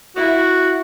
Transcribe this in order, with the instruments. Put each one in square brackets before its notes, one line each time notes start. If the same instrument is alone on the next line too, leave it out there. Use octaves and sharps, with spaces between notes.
[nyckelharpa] E4 [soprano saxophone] F#4